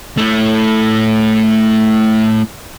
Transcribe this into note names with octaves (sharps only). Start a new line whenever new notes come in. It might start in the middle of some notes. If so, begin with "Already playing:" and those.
A3 E4